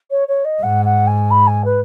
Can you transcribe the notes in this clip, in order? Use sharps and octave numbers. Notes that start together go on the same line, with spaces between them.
C#5
C#5
D#5
G#2 F#5
F#5
G#5
B5
G#5
B4